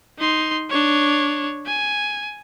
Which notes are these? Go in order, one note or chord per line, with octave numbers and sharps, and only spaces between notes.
D#4 C6
D4 C#5
G#5